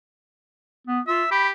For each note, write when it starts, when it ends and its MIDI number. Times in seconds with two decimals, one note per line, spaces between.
0.87 1.00 59
1.07 1.24 65
1.07 1.31 76
1.31 1.52 67
1.31 1.47 83